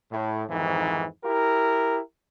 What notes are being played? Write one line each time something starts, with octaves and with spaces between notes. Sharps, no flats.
A2
F2 G#2 D#3 E3
E4 G4 A#4